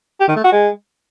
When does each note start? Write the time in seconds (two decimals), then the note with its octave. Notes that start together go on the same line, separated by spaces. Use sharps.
0.20 G4
0.28 D#3
0.36 A3
0.44 F#4
0.52 G#3